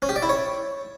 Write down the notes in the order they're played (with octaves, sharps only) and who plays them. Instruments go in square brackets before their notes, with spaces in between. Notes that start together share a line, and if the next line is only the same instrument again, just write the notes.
[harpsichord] C#4
G4
D5
E4
C#5